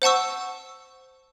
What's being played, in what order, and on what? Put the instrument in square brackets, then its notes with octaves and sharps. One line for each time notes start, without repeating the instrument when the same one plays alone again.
[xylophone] C5 F#5 A5 C#6 E6